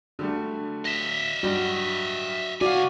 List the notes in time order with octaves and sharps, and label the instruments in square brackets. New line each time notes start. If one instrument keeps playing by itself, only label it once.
[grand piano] D3 G3 A3 [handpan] F#4
[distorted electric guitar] D#5 E5
[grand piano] G2 G3 [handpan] F#4
[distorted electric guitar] C2 G#5 [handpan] F#4 [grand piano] D5 F5